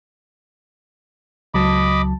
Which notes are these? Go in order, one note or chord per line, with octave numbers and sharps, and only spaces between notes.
C#2 F#3 D#5 A5 B5 D6